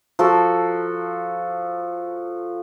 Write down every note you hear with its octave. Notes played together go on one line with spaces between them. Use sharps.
F3 F#4 A4